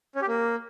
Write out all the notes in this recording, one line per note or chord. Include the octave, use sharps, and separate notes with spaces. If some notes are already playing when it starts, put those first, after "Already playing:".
C#4
G4
A#3